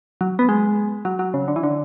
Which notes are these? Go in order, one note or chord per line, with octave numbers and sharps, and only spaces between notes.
F#3
B3
G#3
F#3
F#3
C#3
D3
E3
D3